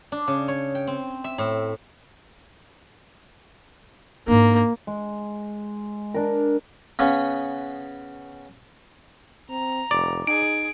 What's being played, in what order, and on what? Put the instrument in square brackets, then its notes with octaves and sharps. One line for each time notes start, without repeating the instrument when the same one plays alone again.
[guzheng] D4
C#3
C#5
G5
C4
E5
A2
[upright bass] G#2 D4 [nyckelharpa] A#3
[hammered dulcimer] G#3
D4 A#4
[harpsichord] C#3 B3 C#4
[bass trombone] C4 [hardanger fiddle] A#5
[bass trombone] F1 [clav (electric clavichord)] D5
[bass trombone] D#4 [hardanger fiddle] G#4 [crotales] D7